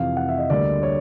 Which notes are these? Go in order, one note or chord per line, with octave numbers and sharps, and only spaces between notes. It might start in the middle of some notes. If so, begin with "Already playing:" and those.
Already playing: F2 C3 E3 F5
F#5
E5
D#5
D2 D3 G3 A#3 D5
C#5